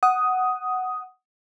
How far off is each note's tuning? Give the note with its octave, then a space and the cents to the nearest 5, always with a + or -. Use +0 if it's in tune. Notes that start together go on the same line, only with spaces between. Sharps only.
F#5 +5 D#6 +5